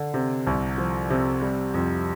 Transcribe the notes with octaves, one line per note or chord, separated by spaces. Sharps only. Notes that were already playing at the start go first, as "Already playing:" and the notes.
Already playing: D3
C3
C2
F3
C3
G3
F2